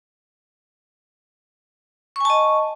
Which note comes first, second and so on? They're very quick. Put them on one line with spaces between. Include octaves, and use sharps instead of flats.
C#6 G#5 A5 D#5